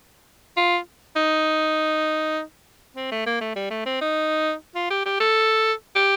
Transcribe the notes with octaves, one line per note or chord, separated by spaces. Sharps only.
F4
D#4
C4
A3
A#3
A3
G3
A3
C4
D#4
F4
G4
G4
A4
G4